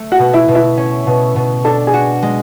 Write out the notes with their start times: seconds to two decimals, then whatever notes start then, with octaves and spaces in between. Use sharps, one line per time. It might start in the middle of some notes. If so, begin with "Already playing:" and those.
Already playing: A3
0.12 F#4 F#5
0.19 B2
0.34 E4 E5
0.48 B2
0.55 E4 E5
0.77 C#4
1.07 B2
1.36 B2
1.65 D4 A4 A5
1.87 G#4 G#5
1.94 F#4
2.23 G#3